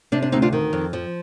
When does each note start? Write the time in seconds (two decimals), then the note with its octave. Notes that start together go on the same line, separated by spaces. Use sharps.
0.12 C3 D4
0.22 D4
0.32 D2 C4 D#4
0.42 D4 F4
0.53 D#3
0.73 F2
0.93 F3